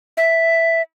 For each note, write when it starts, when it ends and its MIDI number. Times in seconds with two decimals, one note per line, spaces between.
0.17 0.82 76